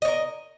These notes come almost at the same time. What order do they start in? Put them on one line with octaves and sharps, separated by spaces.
D#5 C#5 A#4